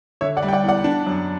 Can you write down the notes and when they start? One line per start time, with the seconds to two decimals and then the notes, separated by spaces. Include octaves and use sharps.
0.21 D3 C#5 E5
0.37 D5 F#5
0.43 G3
0.48 G5
0.53 D5 F#5
0.63 E2
0.68 D5 F#5
0.84 D4
1.07 F#2